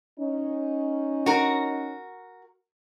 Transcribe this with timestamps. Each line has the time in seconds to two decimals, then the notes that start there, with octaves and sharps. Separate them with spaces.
0.19 C#4 D#4
1.26 F#4 A#4